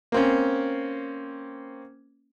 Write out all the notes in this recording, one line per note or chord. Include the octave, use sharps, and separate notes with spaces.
A#3 C4 C#4